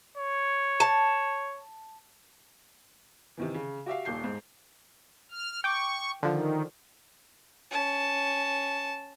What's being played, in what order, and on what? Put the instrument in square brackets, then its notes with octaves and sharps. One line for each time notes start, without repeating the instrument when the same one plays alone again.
[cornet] C#5
[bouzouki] A5
[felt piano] C3 D#3 E3
C#3
F#4 G4 E5 F5
D#1 D#2 G6 C7
G#2
[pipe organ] F6
[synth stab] G5 D6 [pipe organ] C#6
[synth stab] D3 F3 [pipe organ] D#3
[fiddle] C#4 A5